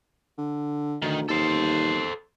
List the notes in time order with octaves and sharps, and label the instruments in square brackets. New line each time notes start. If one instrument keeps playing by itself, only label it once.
[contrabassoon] D3
[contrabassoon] D2 [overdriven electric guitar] D#3
[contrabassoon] D#2 [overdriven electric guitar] A4 C5